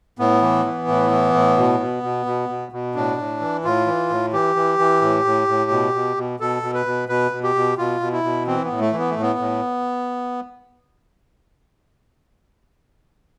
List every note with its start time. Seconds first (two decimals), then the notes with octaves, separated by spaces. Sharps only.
0.19 A2 B3
0.42 E3
0.65 E3
0.88 A2
1.11 E3
1.34 A2
1.57 B2
1.80 B2
2.03 B2
2.26 B2
2.49 B2
2.72 B2
2.95 A2 D4
3.18 A2
3.41 E3
3.64 A2 F4
3.86 E3
4.10 A2
4.33 E3 G4
4.56 E3
4.79 E3
5.01 A2
5.25 A2
5.48 A2
5.71 B2
5.94 B2
6.17 B2
6.40 B2 A4
6.63 B2
6.74 B4
6.86 B2
7.09 B2 B4
7.31 B2
7.43 G4
7.55 B2
7.78 B2 F4
8.01 B2
8.12 E4
8.24 B2
8.47 E3 C4
8.64 B3
8.70 A2
8.81 A3
8.93 E3
8.99 B3
9.10 A3
9.16 A2
9.22 B3
9.39 A2